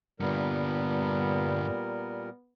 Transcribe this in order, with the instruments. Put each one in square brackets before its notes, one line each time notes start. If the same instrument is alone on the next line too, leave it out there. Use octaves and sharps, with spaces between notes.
[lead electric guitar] G2 D3 [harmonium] A#2 G3 A#4 [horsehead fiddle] B3